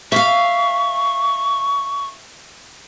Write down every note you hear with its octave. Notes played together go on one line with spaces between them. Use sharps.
E5 F5 C#6